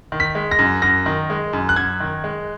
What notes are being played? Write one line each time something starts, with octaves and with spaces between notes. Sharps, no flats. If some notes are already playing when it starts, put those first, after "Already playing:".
D#3
B6
G#3
A#6
F#2
F#2 A#6
D#3
G#3
F#2
F#6
F#2 G#6
D#3
G#3